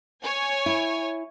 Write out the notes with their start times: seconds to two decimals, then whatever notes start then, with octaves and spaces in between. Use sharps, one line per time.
0.22 C#5 G#5
0.66 E4